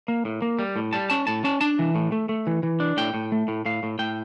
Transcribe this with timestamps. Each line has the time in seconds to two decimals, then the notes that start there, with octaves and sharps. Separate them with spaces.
0.08 A#3
0.25 A2
0.42 A#3
0.59 G3
0.76 A2
0.93 G3 A5
1.10 C#4 A5
1.27 A2 A5
1.44 C#4 A5
1.61 D4 A5
1.79 E3
1.95 A2
2.12 A3
2.29 A3
2.47 E3
2.63 E3
2.80 D4
2.97 A2 G5
3.14 A2
3.32 A3
3.48 A2
3.66 A2 F5
3.83 A2
3.99 A2 G5